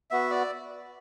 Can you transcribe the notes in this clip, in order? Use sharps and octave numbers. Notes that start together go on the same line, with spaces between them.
B3 F#4 E5
D5